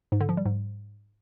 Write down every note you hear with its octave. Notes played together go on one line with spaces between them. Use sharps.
G#2
D3
F3
G3
G#2